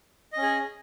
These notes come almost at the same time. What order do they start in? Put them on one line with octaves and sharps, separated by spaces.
D#5 C#4 G#4